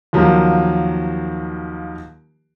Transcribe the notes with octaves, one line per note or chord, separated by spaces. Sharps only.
D#2 F3 F#3 A#3